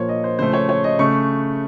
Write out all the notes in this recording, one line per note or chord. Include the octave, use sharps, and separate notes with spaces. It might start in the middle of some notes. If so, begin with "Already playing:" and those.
Already playing: A#2 F3 A#3 C5 C#5
D#5
C5
C#3 F3 A3 C5
C#5
C#5
D#5
C#3 A3 C#6